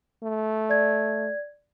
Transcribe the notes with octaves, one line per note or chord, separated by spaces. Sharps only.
A3
D5 G#6